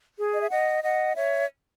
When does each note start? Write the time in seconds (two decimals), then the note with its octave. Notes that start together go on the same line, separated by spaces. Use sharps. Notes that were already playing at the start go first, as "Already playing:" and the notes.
0.17 G#4
0.34 D#5
0.42 E5
0.50 D#5 F#5
0.83 D#5 F#5
1.16 C#5 E5